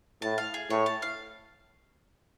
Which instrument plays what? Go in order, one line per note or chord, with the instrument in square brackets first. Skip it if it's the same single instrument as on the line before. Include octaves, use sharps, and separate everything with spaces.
[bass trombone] A2 [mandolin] A5
[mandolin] F5
G#4
[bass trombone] A2 [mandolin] C#5
[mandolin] A5
F5